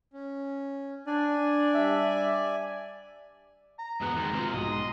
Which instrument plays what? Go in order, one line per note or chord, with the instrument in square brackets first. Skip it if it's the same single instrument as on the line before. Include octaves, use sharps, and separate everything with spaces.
[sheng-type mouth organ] C#4
[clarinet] D4 [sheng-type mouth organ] D5 G#5
[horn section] G3 E5
[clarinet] A#5
[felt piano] E1 F#6 [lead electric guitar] G#2 B3
[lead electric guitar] D#3 G#3
C3 F4
[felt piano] B1 G#2 [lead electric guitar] D#5
[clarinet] C6